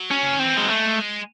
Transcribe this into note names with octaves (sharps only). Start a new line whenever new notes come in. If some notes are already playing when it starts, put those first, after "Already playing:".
Already playing: F#3
C#4
C#3
D#3 C4
E3
F#3 G#3
G#3 A3